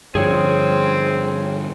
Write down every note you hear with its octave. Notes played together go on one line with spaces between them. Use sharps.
G2 D3 F3 C4 G#4 C#5